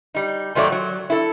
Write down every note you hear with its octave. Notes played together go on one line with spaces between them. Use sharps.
G3 D#4
G#2 D#3 F#3 A3 D5
F#3
E4 A4